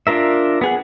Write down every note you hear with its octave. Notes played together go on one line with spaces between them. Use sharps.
D4 F4 A#4 E5
B3 G#4 F#5